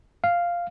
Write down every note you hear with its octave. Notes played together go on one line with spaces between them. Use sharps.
F5